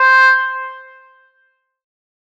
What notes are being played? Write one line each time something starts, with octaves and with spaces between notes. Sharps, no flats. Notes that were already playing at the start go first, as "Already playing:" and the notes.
Already playing: C5